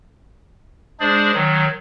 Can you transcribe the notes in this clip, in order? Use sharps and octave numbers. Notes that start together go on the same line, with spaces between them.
G#3 D4 G#4 C5 D5
D#3 F#3